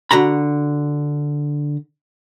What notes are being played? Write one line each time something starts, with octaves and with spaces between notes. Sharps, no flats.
D3 F#4 A#5 B5